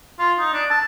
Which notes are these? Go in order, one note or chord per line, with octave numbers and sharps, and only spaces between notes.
F4
D#4
D4
A5